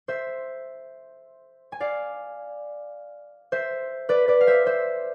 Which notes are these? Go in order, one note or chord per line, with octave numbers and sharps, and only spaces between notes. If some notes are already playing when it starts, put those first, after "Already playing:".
C5 E5
G#5
D5 F5
C5 E5
B4 D5
B4 D5
F5
C5 E5
C5 E5